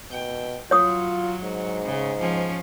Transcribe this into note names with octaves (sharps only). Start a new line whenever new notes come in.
B2 G5
F#3 F4 C#5 D#6
G#2
C#3
F3 C#4